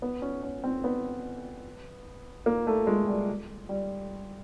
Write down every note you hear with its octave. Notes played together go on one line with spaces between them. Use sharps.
B3
C#4
C#4
C4
B3
A#3
A3
G#3
G3
G3